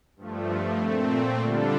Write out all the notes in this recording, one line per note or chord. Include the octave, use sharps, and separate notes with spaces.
G2 F3 A3
A#2 A3 C4
D3 G3 D4 F4 A4